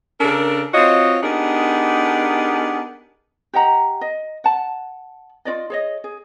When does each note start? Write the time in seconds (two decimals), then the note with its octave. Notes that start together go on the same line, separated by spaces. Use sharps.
0.20 C#3 D4 A4 A#4
0.74 C4 F4 F#4 C#5 D#5
1.23 B3 D4 D#4 G4 G#4 A#4
3.53 G4 D#5 F#5 A#5
4.01 D#5
4.44 F#5 A5
5.45 F4 F#4 D5 D#5
5.70 G#4 C#5 D#5
6.04 G#4